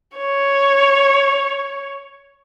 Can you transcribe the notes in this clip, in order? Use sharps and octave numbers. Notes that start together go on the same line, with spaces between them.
C#5